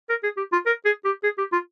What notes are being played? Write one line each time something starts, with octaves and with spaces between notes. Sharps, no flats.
A#4
G#4
G4
F4
A#4
G#4
G4
G#4
G4
F4